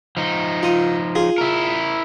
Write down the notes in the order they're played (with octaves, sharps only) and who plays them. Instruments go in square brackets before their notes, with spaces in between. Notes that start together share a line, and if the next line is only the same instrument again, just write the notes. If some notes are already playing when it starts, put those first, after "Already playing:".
[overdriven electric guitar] F3 D#4
[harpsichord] F4 D#6
F4 G#4
[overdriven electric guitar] E4 A#4